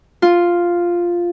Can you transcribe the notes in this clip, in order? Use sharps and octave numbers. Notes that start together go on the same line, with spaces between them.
F4